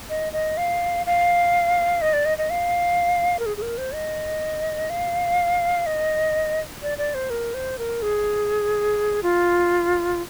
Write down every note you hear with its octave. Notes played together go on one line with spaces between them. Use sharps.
D#5
D#5
F5
F5
D#5
D5
D#5
D#5
F5
A#4
G#4
G#4
A#4
C5
D#5
F5
D#5
D5
D5
C5
A#4
C5
A#4
G#4
F4